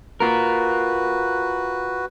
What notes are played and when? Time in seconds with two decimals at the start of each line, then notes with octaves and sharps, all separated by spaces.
0.20 F4 F#4 A#4 B4